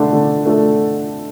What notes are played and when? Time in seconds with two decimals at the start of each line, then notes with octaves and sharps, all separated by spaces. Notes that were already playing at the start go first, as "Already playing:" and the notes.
Already playing: D3 A3 D4 A4
0.13 D3
0.46 A3 D4 A4